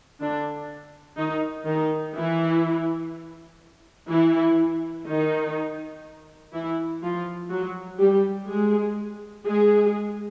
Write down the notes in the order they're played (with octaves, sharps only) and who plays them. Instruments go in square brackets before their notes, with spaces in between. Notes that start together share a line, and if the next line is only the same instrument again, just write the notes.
[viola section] D3 D4
D#3 D#4
D#3 D#4
E3 E4
E3 E4
D#3 D#4
E3 E4
F3 F4
F#3 F#4
G3 G4
G#3 G#4
G#3 G#4